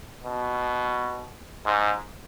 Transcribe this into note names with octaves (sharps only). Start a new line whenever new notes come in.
B2
G#2